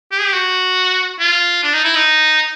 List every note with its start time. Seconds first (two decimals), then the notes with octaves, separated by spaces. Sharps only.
0.12 G4
0.19 G#4
0.26 G4
0.34 F#4
1.20 F4
1.63 D4
1.74 D#4
1.84 E4
1.95 D#4